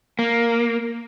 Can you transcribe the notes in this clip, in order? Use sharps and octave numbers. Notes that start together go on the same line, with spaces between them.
A#3